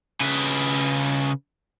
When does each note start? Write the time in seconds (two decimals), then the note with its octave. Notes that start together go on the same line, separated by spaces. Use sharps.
0.21 C#3 B4